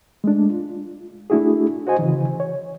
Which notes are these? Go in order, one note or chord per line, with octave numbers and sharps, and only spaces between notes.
G#3 A3 D4
F4
A3 D4 E4 F#4 G#4
F#4 C5 D#5 G#5
C#3 E3
C#5